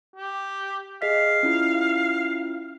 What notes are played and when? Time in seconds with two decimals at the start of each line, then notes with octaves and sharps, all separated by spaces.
0.16 G4
1.02 G#4 D#5 F5 B6
1.43 C#4 E4 F4